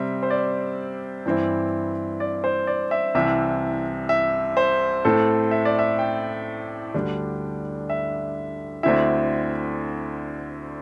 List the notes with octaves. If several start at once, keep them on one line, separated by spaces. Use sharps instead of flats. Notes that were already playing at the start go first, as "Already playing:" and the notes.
Already playing: C3 G3 C4 E5
C5
D5
G2 E3 C4 E4
D5
C5
D5
E5
C2 C3 E3 E5
E5
C5
A2 A3 C4 A4
E5
D5
E5
G5
D2 D3 G3 D4
E5
D2 D3 C4 E4 E5